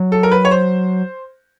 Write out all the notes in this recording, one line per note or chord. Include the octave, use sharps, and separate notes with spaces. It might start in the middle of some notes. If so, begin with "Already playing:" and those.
Already playing: F#3
A4
A#4
B4
C#5
C5